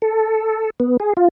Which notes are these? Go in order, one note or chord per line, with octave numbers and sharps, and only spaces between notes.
A4
B3
G#4
F4